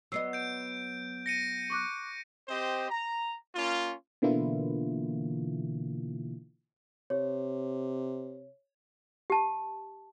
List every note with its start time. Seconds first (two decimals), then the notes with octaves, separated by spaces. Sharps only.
0.12 F#3 B3 D#5 E6 C7
0.33 G6 D7
1.26 A#6 C#7 D#7
1.70 C#6 D6 F#6
2.49 C4 G4 C5 D#5
2.90 A#5
3.56 A#3 C#4 F4
4.22 B2 D3 E3 A#3 E4 F4
7.10 C3 C#5
9.30 G4 A5